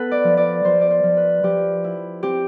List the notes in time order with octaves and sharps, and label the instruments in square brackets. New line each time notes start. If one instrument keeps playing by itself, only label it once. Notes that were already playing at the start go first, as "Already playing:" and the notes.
Already playing: [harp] B3 A4 B4
D5
F3
D5
F3 C5
D5
C5
F3
B4
F3 G4
E4
C4 G4